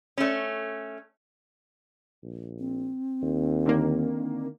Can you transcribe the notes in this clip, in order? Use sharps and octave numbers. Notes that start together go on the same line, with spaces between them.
A3 C#4
A#1
C4
D#2
D3 D#3 A#3